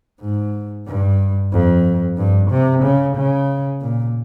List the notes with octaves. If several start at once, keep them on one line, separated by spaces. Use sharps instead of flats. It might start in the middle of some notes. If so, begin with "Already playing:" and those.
G#2
G2
F2
G2
C3
C#3
C#3
A#2